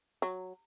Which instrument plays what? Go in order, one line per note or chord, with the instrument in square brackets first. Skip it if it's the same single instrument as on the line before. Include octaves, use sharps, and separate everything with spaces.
[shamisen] F#3